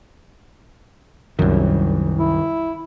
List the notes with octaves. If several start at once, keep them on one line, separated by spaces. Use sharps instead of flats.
C2 F#2 D#3 G3
E4